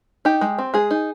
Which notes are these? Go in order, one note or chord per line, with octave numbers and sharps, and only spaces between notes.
D#4 G4
G#3
C4
G#3 G#4
D#4